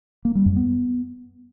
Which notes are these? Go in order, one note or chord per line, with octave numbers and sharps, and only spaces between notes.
A#3
G3
F#2
B3